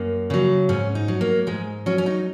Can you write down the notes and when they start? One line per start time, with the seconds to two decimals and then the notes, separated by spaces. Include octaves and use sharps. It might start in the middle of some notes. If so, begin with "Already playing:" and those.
Already playing: F#2 A#3
0.30 C#3 F#3
0.69 G#2 C#4
0.95 D#4
1.08 F#3
1.21 A#3
1.47 G#2 G#3
1.86 F#3 C#4
1.98 C#4
2.06 D#4